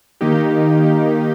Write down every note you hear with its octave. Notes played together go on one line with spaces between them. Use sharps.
D#3 A#3 D#4 G4